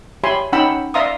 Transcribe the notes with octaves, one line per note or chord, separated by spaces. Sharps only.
G4 C#5 E5 G#5 B5 C6
C#4 D#4 F#5 G5 B5 E6
D5 E5 F5 A#5 C6 D#6